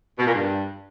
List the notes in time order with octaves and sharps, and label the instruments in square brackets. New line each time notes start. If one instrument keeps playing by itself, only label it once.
[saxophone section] B2
A#2
G2